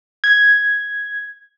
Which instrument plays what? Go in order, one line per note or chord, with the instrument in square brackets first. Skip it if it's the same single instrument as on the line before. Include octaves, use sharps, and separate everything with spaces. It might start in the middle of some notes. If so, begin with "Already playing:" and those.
[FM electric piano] G#6